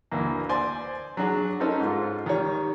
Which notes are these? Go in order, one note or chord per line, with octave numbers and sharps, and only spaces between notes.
D2 E3 A#3
C5 D5 G#5 C6
F#3 D4 F#4 G#4
C#4 D#4 A4 A#4 C5
G#2 F4
D#3 G3 C#5